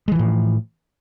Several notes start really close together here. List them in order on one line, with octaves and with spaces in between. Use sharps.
G#3 E3 F3 A2